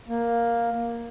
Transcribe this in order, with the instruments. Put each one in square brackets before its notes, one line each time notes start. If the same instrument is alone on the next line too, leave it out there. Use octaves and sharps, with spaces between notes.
[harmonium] A#3